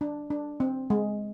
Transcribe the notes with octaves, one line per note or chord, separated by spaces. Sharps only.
D4
D4
C4
G#3